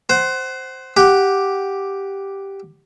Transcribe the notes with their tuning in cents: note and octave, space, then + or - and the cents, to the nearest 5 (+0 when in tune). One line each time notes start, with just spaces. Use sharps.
C5 +0 F#5 +25
G4 +0 F#5 +0